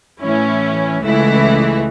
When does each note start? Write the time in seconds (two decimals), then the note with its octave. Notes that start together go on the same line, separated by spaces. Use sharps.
0.21 A2 E3 C#4 E4
1.01 C#2 C#3 E3 A3 E4